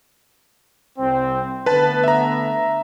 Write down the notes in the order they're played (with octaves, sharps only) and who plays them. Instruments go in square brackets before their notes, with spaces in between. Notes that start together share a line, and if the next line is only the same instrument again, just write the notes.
[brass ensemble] C2 C4
[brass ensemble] D3 A3 B3 [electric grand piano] B4 A5
[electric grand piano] E5 A#5